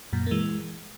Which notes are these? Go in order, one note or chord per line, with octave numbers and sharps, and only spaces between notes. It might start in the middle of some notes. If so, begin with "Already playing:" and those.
F#2 A#2
A#3
E3 G#3